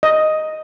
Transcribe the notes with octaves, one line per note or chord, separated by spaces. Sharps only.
D#5